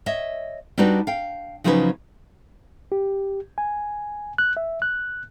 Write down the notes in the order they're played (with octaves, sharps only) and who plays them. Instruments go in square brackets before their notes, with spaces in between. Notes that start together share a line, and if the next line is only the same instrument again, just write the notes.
[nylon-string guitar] C#5 D#5 E5
G3 D4 D#4 F#4 G4 B4
F5 G5
C#3 F3 F#3 C#4 D#4 B4
[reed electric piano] G4
G#5
F#6
E5
F#6